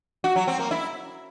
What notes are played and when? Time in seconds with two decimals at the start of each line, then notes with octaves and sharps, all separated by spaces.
0.24 F#4
0.36 F#3
0.48 C4
0.59 A#3
0.71 E4